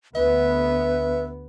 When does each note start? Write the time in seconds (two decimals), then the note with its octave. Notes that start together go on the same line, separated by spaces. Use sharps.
0.15 D2 B3 B4 E5